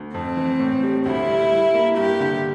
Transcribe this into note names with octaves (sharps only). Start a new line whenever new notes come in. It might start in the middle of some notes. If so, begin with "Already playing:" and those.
Already playing: D2
F2 C4
E3
A2
G3
D2 E4
G3
G3
A#3
G2 G4
D3